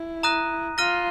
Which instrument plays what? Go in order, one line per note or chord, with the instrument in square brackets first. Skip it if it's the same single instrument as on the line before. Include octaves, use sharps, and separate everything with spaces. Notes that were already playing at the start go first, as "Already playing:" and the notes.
Already playing: [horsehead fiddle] E4
[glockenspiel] A#5 D#6 F#6 A#6 D#7
[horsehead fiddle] F4 [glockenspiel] F6 A#6 D#7 G7